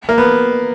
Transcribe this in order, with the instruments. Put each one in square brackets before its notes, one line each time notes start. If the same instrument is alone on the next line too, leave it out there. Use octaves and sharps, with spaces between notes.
[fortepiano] A#3
B3